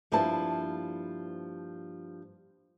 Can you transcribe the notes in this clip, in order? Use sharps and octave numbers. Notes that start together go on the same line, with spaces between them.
G2 F3 A#3 E4 A5